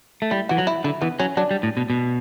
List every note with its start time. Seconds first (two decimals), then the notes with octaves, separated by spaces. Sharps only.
0.22 A3
0.31 G3 E4
0.49 E3 F#4
0.58 F#3
0.67 E4
0.84 D3 E4
1.01 E3 B3
1.19 F#3 C#4
1.37 F#3 D4
1.51 G3
1.63 A2
1.77 B2
1.90 B2